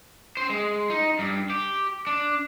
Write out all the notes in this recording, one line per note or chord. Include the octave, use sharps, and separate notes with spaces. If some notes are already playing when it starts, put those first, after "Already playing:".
C5 G5
G#3
D#4
G2
G4
D4